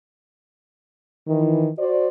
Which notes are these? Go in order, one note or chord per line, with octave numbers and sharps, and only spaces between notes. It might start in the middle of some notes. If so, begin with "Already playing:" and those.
D#3 E3
F#4 C5 D5